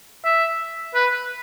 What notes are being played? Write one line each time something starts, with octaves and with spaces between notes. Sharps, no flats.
E5
B4